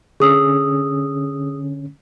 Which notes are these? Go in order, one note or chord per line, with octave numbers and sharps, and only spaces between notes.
D3 C#4 G#4 D#6 E6